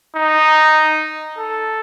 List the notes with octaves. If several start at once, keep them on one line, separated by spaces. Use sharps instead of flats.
D#4
A4